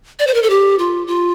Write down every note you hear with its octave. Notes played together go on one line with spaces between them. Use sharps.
D5
C5
A#4
A4
G4
F4
F4